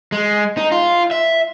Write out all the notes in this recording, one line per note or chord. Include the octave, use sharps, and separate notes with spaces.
G#3
D#4
F4
E5